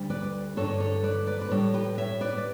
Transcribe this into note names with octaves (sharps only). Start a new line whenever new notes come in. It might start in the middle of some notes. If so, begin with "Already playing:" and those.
Already playing: D2 D3 G3
B4 D5
G2 D3 A3 A4 C#5
A4 C#5
B4 D5
B4 D5
B4
A2 G3 A4 C#5
G4 B4
C#5 E5
B4 D5
D5